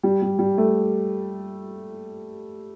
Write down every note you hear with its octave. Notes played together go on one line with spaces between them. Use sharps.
G3
G3
G3
A3